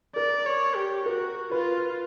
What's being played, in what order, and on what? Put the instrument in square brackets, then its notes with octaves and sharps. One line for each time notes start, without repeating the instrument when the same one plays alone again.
[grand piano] A#4 [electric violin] D5
[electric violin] C#5
G4
[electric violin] F#4 [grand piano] A#4
[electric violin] F4 [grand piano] B4